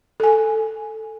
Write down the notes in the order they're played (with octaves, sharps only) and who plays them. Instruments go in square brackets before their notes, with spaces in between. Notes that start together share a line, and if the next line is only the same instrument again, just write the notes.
[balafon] A4 G#5